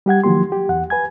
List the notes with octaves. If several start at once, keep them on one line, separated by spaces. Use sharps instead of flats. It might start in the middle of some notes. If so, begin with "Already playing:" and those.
G3 G4 F#5 G#6
D#3 F3 F#3 A#3 G4 C6
G4
E2 F#5
B4 G#5 G#6